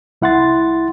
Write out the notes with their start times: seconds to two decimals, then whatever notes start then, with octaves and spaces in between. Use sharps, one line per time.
0.22 C2 E4 F#5 C6 A6